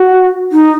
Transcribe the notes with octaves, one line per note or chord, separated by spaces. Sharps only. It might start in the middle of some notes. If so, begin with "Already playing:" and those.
Already playing: F#4
D#4